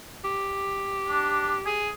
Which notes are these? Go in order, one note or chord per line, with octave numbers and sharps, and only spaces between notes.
G4
D4
G#4